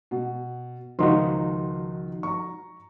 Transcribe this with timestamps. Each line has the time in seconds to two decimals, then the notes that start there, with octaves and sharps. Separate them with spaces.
0.11 B2
0.99 C#2 D#3 F3 D#4 F#4 C6
2.23 A#5 C#6